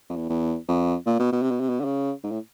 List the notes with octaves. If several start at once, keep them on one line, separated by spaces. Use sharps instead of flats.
F2
E2
E2
F2
A#2
B2
B2
C3
B2
C3
B2
D3
C#3
G#2
A2